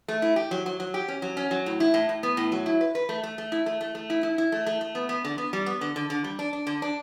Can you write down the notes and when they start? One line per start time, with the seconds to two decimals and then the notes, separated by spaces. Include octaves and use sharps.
0.08 A3
0.22 E4
0.36 G4
0.51 F#3
0.66 F#3
0.80 F#3
0.94 G4
1.08 C#4
1.22 F#3
1.37 C#4
1.51 F#3
1.66 A2
1.80 E4
1.94 A2
2.09 A2
2.23 B3
2.37 A2
2.52 F#3
2.66 E4
2.81 B4
2.95 B4
3.09 A3
3.23 A3
3.38 A3
3.52 E4
3.66 A3
3.81 A3
3.95 A3
4.10 E4
4.23 E4
4.38 E4
4.52 A3
4.66 A3
4.81 A3
4.95 B3
5.09 B3
5.25 D3
5.38 B3
5.53 G3
5.66 B3
5.81 D3
5.96 D3
6.10 D3
6.24 G3
6.39 D4
6.53 D4
6.67 D3
6.82 D4